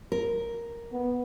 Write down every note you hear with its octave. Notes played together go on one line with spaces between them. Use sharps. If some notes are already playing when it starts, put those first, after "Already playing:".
A#4
B3